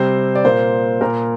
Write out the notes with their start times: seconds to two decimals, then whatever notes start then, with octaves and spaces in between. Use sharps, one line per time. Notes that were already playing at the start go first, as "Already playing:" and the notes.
Already playing: C3 G3 C4 C5
0.35 D5
0.44 A#2 A#3 C5
1.01 A#2 A#3 A#4